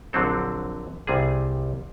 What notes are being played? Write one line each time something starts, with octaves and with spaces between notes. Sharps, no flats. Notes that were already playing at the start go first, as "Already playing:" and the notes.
A#1 D3 F#3 C4 A4
C2 C3 G3 G#4